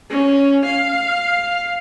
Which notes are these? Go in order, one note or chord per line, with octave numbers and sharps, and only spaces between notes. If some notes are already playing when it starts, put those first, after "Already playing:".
C#4
F5